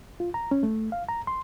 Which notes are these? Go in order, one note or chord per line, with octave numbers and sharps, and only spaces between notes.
F4
A#5
C#4
A3
F5
A#5
C6